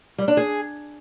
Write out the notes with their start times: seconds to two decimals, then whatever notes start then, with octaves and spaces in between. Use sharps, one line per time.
0.18 G3
0.28 D4
0.37 G#4